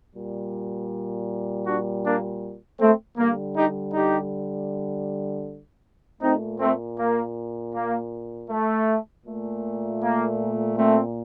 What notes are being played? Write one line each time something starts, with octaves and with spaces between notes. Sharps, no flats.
A#2 G3
D4 F#4
A#3 D4
A3 C4
D3 G3 A#3
D#4 G4
D#4 G4
A#2 A3 C4 D#4
A3 C4
A#3
A#3
A3
A#2 A3
A#3
A3 C4